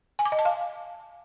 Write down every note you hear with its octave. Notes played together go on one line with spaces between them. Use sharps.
G#5
D6
D#5
A5
F5